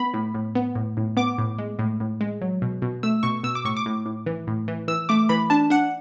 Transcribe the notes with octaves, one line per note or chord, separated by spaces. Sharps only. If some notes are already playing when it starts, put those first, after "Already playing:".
Already playing: B3 B5
A2
A2
B3
A2
A2
B3 D6
A2
G#3
A2
A2
G#3
F#3
B2
B2
A3 E6
B2 C#6
B2 E6
D6
A2 C#6
D6
A2
A2
E3
A2
E3
E3 E6
A3 D6
E3 B5
D4 A5
D4 F#5